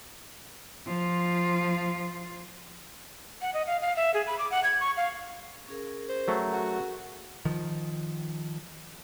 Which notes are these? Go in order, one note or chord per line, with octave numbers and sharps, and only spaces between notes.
F3 F4
F#5
D#5
F5
F5
E5
G#4
B5
D6
F#5
G#6
C#6
F5
C#4 G#4 A#4
C5
F#3 A3
F#4
D#3 F3